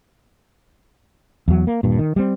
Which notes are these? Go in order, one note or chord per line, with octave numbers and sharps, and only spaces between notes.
E2 F#3
A#3
D#1 G2 A#2
D#3
G3 C4